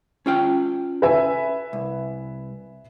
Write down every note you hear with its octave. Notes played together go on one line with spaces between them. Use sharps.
C#4 F4 G5
B4 E5 G#5
C2